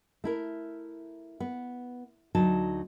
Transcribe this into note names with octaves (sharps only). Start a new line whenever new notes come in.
A3 E4 A#4
B3
D2 F#3 D#4 A5